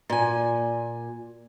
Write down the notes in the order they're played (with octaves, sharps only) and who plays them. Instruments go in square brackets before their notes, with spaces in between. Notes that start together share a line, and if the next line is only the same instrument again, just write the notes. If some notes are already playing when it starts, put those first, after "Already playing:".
[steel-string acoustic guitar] A#2 G#5